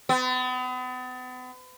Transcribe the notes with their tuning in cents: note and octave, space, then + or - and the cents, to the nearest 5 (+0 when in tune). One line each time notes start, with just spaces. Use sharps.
B3 +40